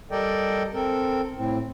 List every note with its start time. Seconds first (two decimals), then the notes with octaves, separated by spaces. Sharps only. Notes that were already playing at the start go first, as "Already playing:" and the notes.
0.11 G3 A4 A#4 D5 D#5 G5
0.74 C4 A4 A#4
1.37 A2 C4